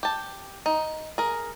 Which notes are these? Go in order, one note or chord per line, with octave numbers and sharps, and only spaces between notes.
G4 A5
D#4
G#4 A#4